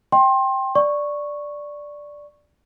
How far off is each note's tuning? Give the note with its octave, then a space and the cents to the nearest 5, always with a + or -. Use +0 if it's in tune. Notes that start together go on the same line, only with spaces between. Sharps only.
D#5 -5 G5 +0 C6 +25
D5 +0 C#6 -5